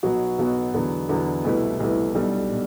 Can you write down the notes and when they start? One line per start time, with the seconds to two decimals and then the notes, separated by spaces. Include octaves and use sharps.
0.03 B1 B2 F#3 B3 F#4
0.39 B1 B2 F#3 B3 F#4
0.74 E2 D3 F#3 B3
1.09 E2 D3 F#3 B3
1.44 C2 B2 A3 E4 B4
1.80 C2 B2 A3 E4 B4
2.15 B1 B2 G3 D4 A4
2.51 B2